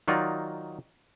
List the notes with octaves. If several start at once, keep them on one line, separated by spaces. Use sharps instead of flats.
D#3 F#3 D#4 F4 D5